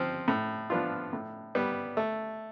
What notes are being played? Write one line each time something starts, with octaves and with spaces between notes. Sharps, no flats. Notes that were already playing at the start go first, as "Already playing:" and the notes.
Already playing: F3 C4
A2
F3 B3 D4 F4
A2
G3 B3
A3